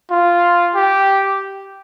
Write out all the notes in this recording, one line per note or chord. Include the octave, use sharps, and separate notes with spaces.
F4
G4